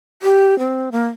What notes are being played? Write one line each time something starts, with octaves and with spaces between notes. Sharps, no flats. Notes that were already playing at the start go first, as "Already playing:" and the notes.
G4
C4
A#3